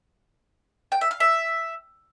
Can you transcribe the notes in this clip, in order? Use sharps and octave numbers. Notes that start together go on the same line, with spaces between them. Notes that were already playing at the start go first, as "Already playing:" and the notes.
G5
E5
F5
E5